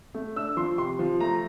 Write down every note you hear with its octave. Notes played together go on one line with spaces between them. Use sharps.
A3
D4 E6
F3 C6
C3 C6
F3
A3 A#5